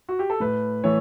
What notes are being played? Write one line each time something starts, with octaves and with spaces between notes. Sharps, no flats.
F#4
G4
A4
A2 B4
E3 A3 C#5